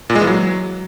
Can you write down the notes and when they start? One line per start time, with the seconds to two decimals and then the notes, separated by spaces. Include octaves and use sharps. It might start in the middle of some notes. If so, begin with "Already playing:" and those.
0.10 A#2
0.15 G#3
0.21 E3
0.27 F#3